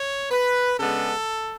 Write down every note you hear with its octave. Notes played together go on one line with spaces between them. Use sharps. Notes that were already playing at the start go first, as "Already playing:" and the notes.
Already playing: C#5
B4
C#3 G#3 B3 D4 A4